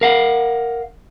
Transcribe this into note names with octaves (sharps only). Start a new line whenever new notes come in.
A#4 F5 F#5